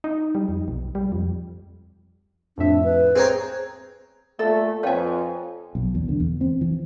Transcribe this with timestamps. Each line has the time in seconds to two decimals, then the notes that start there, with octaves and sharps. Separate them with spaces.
0.04 D#4
0.35 G3
0.49 F2
0.68 B1
0.95 G3
1.12 F2
2.58 F2 A2 D4 E5
2.84 B4
3.16 C4 G#4 C5 C#5 A#5
4.39 A#2 A3 A4 E5
4.83 F2 B4 C#5 F5 G5 G#5
5.75 B1
5.95 E2
6.09 D3
6.20 E2
6.41 C4
6.61 E3